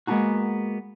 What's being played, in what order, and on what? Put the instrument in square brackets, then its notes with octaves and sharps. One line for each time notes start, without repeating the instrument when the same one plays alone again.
[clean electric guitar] G#3 A#3 B3 D4 D#4 F#4